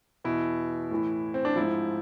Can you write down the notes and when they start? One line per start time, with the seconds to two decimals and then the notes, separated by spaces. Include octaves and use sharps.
0.25 E2 B2 E4
0.91 A2 E3
1.34 C4
1.45 D4
1.56 G#2 F3 E4